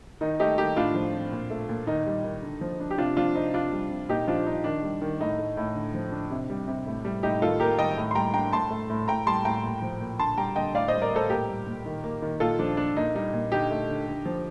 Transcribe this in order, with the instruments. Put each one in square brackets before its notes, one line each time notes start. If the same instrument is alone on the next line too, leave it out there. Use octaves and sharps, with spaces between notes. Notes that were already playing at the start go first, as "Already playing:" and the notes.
[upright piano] D#3 D#4
A3 D#4 G4
D#3 D#4 G4
A2 D4 F4
F3
C4
A#2
A3
A#2
D#3 D#4
G3
D#3
D3
F3
D4
G4
C3 D4 F4
F3 D4 F4
C4 D#4
C3 D4 F4
G3
C3
A#2 D#4 G4
F3 D4 F4
D4 D#4
D#3 D4
G3
D#3
A2 D#4
A3
A2
D3
F3
D4
C3
G3
C3
A2
G3
A2 D#4 G4
D#3 F4 A4
A#3 G4 A#4
D#3 D#5 G5
A2
C6
G3 G5 A#5
D4 G5 A#5
A2 A5 C6
A3
A2
A2 G5 A#5
G3 A5 C6
A2 G5 A#5
A#2
F3
A#2
D3 A5 C6
G3 G5 A#5
D3 D#5 G5
A2 D5 F5
C5 D#5
G3
A#4 D5
A2 A4 C5
A#2 G4 A#4
G3
A#2
D#3
A#3
D#3
A#2 F4 A4
F3 D4
D4
A#2 D#4
G3 D#4
A#2
D3 D#4 G4
A3
D3
D3
F3